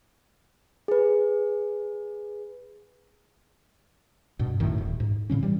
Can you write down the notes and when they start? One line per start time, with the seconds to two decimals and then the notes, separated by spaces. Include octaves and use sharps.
0.88 G#4 B4
4.39 G2 B2
4.60 A#1 F#2 A2 D#3
4.78 D#1
5.00 G#2
5.30 A2 C#3 F#3 C#4
5.43 E3 G3